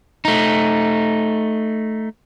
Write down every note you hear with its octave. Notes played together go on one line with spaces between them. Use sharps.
A3 D#4